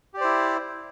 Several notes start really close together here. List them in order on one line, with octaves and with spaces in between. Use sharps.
G4 D5 C5 E4